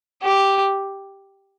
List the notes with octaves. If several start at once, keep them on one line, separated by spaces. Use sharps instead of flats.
G4